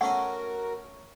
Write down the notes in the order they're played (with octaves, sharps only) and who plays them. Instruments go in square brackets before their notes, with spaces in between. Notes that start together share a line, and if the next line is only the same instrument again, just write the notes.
[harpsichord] A3 C#4 G#5 [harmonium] F#4 A#4 [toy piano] F#5